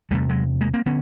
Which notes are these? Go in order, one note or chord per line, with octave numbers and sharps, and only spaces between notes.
E2 C3 G3 A3
F#3 G#3
G#3 A#3
A#3 C4
D3 B3 C#4